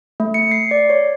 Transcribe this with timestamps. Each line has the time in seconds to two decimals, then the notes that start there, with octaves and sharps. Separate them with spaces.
0.20 A3
0.34 C#7
0.51 C7
0.71 D5
0.90 C#5